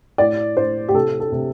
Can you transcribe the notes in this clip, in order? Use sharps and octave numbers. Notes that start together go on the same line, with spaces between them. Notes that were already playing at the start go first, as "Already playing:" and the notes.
A2 D5
A2 C5
G4
C3 A4
A4
C3